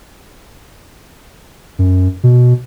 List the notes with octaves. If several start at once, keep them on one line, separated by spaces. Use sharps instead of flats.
F#2
B2